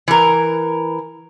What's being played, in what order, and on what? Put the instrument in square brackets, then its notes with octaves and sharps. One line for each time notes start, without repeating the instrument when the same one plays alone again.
[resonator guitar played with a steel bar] E3 A#4